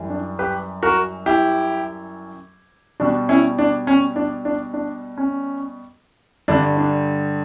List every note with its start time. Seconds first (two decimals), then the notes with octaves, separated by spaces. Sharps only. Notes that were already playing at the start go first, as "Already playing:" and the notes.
Already playing: F#2 E3 G3
0.10 D4
0.39 G4 B4
0.83 F#4 A#4
1.26 E4 G4
3.00 B2 G3 D4 F#4
3.29 C#4 E4
3.59 D4
3.87 C#4
4.16 D4
4.45 D4
4.74 D4
5.18 C#4
6.48 G2 D3 G3 D4
6.77 D4